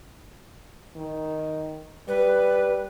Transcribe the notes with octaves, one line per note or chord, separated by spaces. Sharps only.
D#3
G3 B4